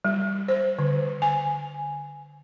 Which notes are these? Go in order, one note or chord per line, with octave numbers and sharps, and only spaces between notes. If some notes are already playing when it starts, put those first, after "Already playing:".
G3
C5
D3
G#5